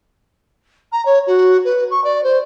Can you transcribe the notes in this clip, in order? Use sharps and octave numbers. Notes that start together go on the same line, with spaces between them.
A#5
C#5
F#4
B4
C#6
D5
C5